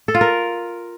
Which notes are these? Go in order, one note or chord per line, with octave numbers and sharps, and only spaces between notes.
A4
F4
A#4